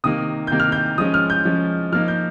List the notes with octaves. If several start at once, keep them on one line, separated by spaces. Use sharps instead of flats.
C3 D#3 A#3 D#6
C3 D#3 A#3 G6
F6
G6
F3 G#3 C#4 D#6
F6
G6
F3 G#3 C#4
F3 A#3 D#4 F6
G6